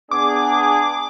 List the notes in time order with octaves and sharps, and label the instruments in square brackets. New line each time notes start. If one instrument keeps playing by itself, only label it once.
[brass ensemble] B3 D4 G#4 [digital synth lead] D6